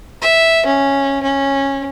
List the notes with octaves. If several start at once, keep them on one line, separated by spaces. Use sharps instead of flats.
E5
C#4
C#4